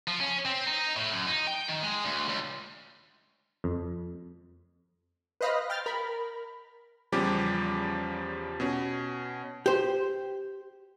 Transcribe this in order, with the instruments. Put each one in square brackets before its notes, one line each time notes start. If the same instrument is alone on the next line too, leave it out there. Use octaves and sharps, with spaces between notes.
[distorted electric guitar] F3
C#4
C4
D#4
A2
F#2
D#4
G5
D#3
G#3
D2
C#2
[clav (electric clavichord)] F2
[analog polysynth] B4 C5 D#5 F5 B5
G5 F6 A6
A#4 B5
[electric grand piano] E2 C#3 F3 G3 G4 D6
B2 C#4
[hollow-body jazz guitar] G4 C5